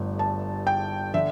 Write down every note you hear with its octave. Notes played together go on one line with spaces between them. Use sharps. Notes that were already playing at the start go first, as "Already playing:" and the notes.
Already playing: G1 G2 A3
A5
G5
D3 E5